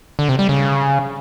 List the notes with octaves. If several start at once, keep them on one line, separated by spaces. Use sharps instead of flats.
D3
C3
G3
C#3